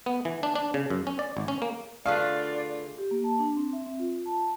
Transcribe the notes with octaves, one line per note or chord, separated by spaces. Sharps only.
B3
E3
D4
D4
C#3
F#2
C#4
D5
G#1
C#4
A#3
D3 A3 F4 G#4 B4 D5 F5
G4
A#3
A5
D4
C4
E5
C4
F4
A5